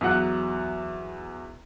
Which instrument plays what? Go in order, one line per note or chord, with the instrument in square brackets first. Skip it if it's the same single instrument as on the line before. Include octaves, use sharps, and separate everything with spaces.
[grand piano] E2 F#3 F#5 F#6